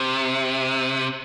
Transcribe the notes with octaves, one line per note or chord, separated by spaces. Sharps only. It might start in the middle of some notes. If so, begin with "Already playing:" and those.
Already playing: C3